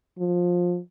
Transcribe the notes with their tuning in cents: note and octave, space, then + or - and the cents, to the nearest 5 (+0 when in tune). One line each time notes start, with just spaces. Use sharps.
F3 +20